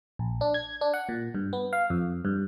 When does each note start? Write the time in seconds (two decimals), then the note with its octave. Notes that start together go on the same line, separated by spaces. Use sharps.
0.19 A#1
0.41 D4
0.54 G#6
0.81 D4
0.94 F#5
1.09 A#2
1.34 G2
1.53 B3
1.73 F5
1.90 F2
2.25 G2